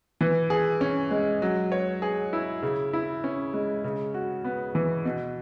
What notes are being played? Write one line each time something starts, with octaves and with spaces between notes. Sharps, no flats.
E3
G#4
C#4
G#3
F#3
C#5
G#4
E4
C#3
E4
C#4
G#3
C#3
F#4
B3
E3
B2